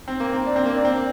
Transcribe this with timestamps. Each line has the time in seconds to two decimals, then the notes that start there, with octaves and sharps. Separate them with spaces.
0.08 C4
0.20 A#3
0.33 C4
0.46 D4
0.56 C4
0.66 A#3
0.75 D4
0.85 C4